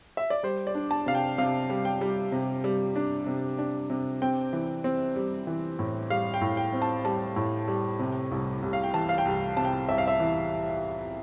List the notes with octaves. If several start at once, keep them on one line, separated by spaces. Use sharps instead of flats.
E5
D5
G3 C5
D5
D4
A5
C3 F5
G5
C3 F5
G3
G5
G3
C3
G3
D4
C3
D4
C3
C4 G5
E3
C4
G3
E3
A2
G3 F5
G5
A2
G5
C4
A5
G3 A5
A2
G3
C3
C2
C2
F5
G5
E3 A5
F5
G5
C2
C3 A5
G5
C2 E5
F5
E5
E3